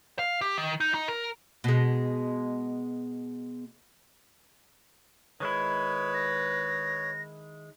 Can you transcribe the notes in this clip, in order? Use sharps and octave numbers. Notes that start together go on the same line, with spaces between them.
F5
G4
D#3
D#4
D#4
A#4
B2 G#3
D#3 G#3 E4 B4 C#5
A#6